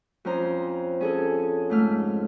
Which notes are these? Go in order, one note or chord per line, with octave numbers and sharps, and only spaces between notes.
F2 C#4 C5 A#5
C#4 G#4 A4
G#2 A3 F6